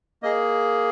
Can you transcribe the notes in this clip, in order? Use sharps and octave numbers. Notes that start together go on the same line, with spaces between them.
A#3 G#4 D#5